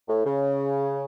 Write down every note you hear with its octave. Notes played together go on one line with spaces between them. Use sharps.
A2
C#3